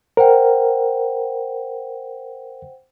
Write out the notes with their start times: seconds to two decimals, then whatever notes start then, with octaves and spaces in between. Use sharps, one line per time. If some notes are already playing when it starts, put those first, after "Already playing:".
0.17 A#4 C5 F#5 G5